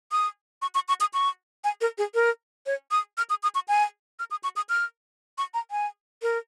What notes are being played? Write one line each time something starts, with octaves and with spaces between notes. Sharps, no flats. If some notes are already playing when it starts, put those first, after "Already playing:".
D#6
C#6
C#6
C#6
D#6
C#6
G#5
A#4
G#4
A#4
C#5
D#6
F6
D#6
D#6
C#6
G#5
F6
D#6
C#6
D#6
F6
C#6
A#5
G#5
A#4